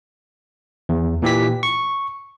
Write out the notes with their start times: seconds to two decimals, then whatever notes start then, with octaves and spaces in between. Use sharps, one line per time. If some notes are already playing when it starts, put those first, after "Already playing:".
0.89 E2
1.22 A#2 E3 G4 B6
1.63 C#6